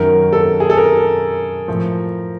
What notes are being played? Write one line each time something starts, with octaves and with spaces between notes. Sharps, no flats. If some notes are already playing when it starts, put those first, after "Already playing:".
Already playing: F#2 D#3 F#3 A#4
A4
G#4
A4
A#4
A2 F3